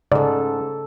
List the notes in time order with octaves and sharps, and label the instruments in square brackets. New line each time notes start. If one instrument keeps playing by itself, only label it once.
[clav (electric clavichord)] G#2 [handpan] C#3 A4 [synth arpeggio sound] D5